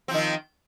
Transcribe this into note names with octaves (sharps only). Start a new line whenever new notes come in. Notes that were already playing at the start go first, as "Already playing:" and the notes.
D#3 F3 C4